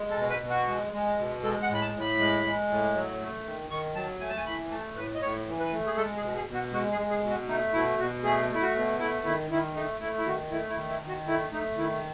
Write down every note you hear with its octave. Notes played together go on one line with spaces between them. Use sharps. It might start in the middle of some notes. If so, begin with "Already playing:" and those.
Already playing: G#3
A4
B2
B4
B2
F#4
G#3
G#3
B2
G#3 A4
F#5
A2
B5
A5
A2
B5
G#3
G#3
A2
F#3
A3
D#3
D#3 C#6
F#3 A5
A3 G#5
A5
G#5
E3 B5
A3 A5
A2 B4
D#5
A2 C#5
E3
B4
A3
G#4
G#3 A4
G#4
B2
G#4
B2
F#4
G#3 F#4
G#4
G#3
G#4
B2
F#4
A3 D#4
B2 E4
B2 F#4
A3 G#4
A3
E4
F#4
B2
A3 E4
D#3 E4
D#3 E4
A3 D#4
A3 E4
E4
D#3 F#4
A3 E4
E4
D#3
E4
D#3
F#4
A3 E4
A3 D#4
D#3 E4